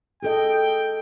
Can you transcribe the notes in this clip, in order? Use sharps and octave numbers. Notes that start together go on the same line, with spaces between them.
G#4 A4 D#5 G5